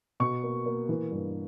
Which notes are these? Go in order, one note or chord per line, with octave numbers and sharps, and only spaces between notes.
B2 C#6
A#3
A#3
E3
G2